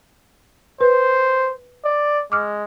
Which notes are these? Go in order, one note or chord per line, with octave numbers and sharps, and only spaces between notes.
B4 C5
D5
G#3 D6 F6